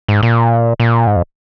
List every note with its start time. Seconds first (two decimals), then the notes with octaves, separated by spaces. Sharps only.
0.08 G#2
0.23 A#2
0.80 A#2
1.07 G#2
1.16 F2